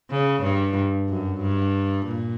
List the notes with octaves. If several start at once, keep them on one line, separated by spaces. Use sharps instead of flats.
C#3
G2
F#2
G2
A#2